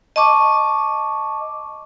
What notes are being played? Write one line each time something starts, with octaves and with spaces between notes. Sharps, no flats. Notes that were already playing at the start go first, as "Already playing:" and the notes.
D#5 A5 C#6 D6